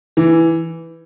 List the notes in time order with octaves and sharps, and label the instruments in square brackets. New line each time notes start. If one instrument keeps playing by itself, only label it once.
[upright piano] E3